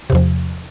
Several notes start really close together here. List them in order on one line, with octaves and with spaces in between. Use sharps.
C3 E2 F3